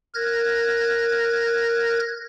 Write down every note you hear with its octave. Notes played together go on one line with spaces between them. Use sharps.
A#4 F#6 G#6 A#6